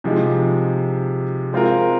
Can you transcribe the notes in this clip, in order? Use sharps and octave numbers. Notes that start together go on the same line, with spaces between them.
C3 F3 G#3 D#4
G#3 C4 F4 A#4